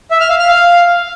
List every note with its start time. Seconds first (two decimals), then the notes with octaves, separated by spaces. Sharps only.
0.11 E5
0.20 F6
0.30 F5
0.39 F6
0.48 F5